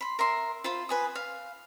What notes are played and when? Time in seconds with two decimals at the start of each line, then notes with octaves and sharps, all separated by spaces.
0.01 B5 C6
0.19 A#4 E5 C6
0.64 F4 C5 B5
0.89 B4 G#5 D#6
1.15 F5